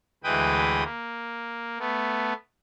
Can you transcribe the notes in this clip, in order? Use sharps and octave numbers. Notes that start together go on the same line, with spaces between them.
D2 E3 G#3 B4 G5 D#6
A#3
A3 B3